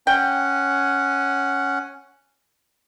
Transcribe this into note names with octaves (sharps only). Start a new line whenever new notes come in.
C#4 F#5 G5